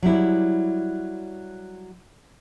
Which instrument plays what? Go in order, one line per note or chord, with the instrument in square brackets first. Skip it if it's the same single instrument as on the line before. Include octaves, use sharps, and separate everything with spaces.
[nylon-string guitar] F#3 G3 E4